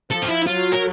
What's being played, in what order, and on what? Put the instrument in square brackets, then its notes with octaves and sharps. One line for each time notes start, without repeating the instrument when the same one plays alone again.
[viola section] F3 [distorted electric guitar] A4
[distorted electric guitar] F4
E4
[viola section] F#3 [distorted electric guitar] F4
[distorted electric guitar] A#4